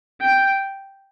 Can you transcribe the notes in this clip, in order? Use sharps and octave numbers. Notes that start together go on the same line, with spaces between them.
G5